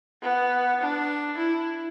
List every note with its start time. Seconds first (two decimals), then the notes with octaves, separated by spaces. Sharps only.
0.22 B3
0.81 D4
1.38 E4